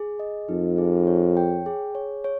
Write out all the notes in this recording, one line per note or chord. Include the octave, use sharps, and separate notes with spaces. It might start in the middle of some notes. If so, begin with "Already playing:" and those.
Already playing: G#4
D#5
F2 D#4
G#4
C#5
G5
G#4
C#5
C#5